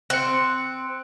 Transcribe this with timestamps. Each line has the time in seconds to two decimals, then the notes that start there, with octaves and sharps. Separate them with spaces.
0.10 C4 F#6 C#7